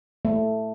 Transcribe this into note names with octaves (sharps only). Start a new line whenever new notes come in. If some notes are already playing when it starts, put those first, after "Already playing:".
A3